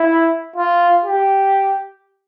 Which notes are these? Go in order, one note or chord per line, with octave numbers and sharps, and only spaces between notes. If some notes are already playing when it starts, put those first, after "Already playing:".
Already playing: E4
F4
G4